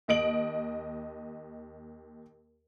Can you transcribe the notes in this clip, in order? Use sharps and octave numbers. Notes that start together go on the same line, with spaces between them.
D#2 D#5 D7 F#7